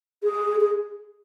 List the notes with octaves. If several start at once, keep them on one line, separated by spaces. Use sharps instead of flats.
G#4
G#4